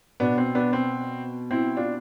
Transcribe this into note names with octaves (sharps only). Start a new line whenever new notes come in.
B2 B3 D4
C4
B3 D4
C4
C4 E4
D4 F4